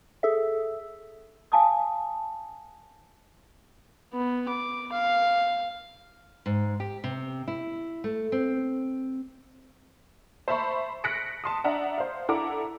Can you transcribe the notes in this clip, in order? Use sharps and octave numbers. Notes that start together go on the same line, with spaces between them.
G#4 A4 E5
F5 G#5 A5 D6 D#6
B3
D6
F5
G#2
G4
C3
E4
A3
C4
C5 E5 A5 B5 C#6
F#6 A#6 B6 C#7 D7
A5 C6 D#6
D4 D5 E5 F#5 A#5
C5 F5
D4 E4 A4 F#5 A#5 D6